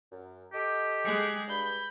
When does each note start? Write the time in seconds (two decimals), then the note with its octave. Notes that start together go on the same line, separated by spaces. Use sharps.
0.11 F#2
0.53 G4 A4 D#5
1.03 G#3 G#4 F#6
1.48 G2 B5 G6